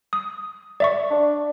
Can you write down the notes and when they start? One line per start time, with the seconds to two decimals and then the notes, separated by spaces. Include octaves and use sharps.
0.13 D#6
0.80 D5 E5 C#6
1.11 D4